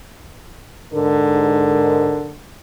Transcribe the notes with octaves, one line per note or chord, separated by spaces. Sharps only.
G#2 D3 A#4